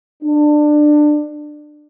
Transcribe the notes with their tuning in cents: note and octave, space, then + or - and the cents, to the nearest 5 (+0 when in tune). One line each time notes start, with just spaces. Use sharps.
D4 +20